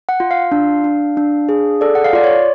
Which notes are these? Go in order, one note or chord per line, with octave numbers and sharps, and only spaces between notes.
F#5
F4
F5
D4
D4
D4
G#4
A4 D5
F#5
F5
F4 D5
C#5